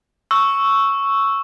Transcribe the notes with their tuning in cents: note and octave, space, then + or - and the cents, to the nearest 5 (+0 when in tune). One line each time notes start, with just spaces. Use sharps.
C#6 +0 E6 +0